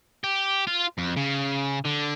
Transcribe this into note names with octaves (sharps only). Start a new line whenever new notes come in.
G4
F4
F2
C#3
D3